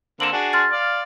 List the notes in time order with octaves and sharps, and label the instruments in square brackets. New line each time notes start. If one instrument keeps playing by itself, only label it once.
[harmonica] D3 A#3 C4 [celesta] E7 F#7
[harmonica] D4 F#4 G#4
[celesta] C6 F6 A6
[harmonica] D5 F5